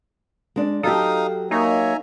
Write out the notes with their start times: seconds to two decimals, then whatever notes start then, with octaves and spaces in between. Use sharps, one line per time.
0.56 G#3 D4
0.83 F#3 D#4 G4 A4 F5 D#6
1.51 A#3 D#4 C#5 E5 G#5 A#5